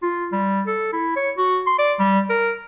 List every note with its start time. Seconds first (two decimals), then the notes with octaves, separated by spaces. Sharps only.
0.03 F4
0.32 G3
0.67 A4
0.93 E4
1.16 C#5
1.38 F#4
1.67 C6
1.79 D5
2.00 G3
2.30 A#4